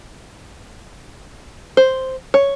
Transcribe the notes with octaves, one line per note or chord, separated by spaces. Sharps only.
C5
C#5